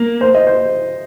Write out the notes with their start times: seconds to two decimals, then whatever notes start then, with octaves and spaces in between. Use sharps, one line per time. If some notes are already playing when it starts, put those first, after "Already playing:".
Already playing: A#3
0.21 C5
0.35 D#5
0.47 C5